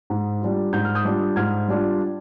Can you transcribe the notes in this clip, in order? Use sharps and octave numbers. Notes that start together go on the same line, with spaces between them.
G#2
G3 D4 F4
G#2 G6
F6
D#6 G6
G3 D4 F4
G#2 F6 G#6
G3 D4 F4